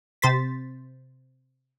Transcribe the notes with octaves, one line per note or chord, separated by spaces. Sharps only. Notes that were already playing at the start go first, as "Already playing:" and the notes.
C3 C5 A6 B6